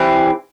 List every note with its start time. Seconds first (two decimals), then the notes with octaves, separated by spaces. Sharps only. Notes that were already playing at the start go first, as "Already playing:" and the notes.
Already playing: E3 G3 C4